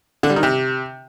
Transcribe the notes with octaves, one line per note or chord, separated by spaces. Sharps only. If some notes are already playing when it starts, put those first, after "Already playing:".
D3
G3
D#3
C3